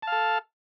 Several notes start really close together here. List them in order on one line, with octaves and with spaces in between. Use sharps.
A5 F5 A4